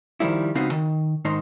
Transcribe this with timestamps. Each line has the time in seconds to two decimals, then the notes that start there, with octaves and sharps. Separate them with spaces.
0.20 D#3 F3 G3 E4
0.55 C#2 B3 C4 D#4 F#4 F5
0.71 D#3
1.25 G#2 D#3 D#4 C5